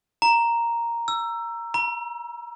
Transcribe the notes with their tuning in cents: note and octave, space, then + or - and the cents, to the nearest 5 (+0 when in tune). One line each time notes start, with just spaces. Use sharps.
A#5 +0
E6 +20
A#5 +40